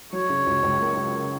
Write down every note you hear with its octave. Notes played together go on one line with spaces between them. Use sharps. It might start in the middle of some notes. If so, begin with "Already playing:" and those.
F#3 C#5
C#3
C#2
C#2
A#3
C#3